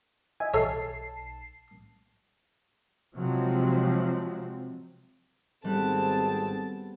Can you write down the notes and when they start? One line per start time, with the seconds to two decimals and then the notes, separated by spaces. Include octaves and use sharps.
0.40 D#5 E5 G#5
0.54 B1 A4 C#5 A5 C7
3.14 C3 F3 F#3 G#3 C4
5.65 G#1 G3 B3 C4 G#4 A4 F#5 A5